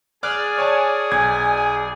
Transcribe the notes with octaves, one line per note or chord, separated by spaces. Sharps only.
G#4 D5 D6 F6 F#6
C#5 G#5 A5
B1 G#5 G#6